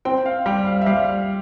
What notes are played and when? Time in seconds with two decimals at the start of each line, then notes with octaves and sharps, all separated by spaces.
0.05 C4 G5
0.26 F5
0.46 G3 G5
0.66 F5
0.81 E5
0.86 G3 F5